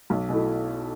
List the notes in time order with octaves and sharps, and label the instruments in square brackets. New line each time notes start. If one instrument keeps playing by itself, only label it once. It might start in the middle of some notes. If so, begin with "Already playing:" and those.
[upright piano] B1
B2 A3 E4